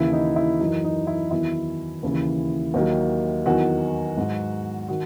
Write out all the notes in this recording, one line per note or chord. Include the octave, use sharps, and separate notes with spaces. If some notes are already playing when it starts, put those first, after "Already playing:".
Already playing: D#2 C#3 E3 E4
D#4
E4
F#2 E3 D#4
D#4
E4
E2 D#3 F#3 E4
D#2 C#3 E3
D#2 D#3 F#3
E2 D#3 F#3 F#4
G#2 F#3
D#3 F#4